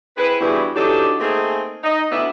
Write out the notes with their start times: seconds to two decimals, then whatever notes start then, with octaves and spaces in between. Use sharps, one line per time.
0.17 C4 E4 G#4 B4
0.41 E2 G2 B2 G3 E4 G#4
0.75 E3 F#3 D4 D#4 G4 A4
1.20 A3 A#3 C4 D#4 G#4
1.83 D#4 D#5
2.11 D2 B3 D4 E4 E5